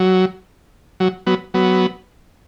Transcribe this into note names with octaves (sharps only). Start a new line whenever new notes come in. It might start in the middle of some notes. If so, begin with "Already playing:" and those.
Already playing: F#3
F#3
F#3 B3
F#3 B3